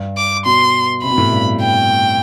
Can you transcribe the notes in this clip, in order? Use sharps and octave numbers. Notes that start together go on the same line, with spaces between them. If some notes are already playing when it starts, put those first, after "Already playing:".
Already playing: G2
D6
B2 C6
C3 B5
B2
A2
G2
G5